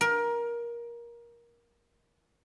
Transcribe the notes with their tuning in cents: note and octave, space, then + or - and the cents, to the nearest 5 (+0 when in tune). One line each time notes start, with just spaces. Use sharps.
A#4 +20